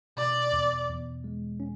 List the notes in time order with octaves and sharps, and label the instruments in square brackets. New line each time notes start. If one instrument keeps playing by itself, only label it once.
[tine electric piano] B2 [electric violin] D5
[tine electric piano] E2
E2
G#3
C#4